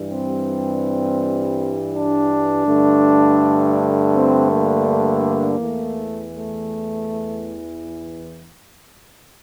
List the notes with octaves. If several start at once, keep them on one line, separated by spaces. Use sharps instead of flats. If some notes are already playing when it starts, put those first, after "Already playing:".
Already playing: G2 E3 G3
C4
D4
G2 D3 A3
C4
A#3
E2 E3 A3
A3